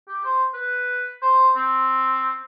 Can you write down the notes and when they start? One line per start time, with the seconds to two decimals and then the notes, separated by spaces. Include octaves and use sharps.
0.08 G4
0.25 C5
0.54 B4
1.22 C5
1.56 C4